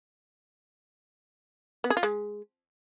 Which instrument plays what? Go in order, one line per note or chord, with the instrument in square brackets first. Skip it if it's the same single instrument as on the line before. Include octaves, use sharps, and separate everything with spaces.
[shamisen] B3
G#4
F4
G#3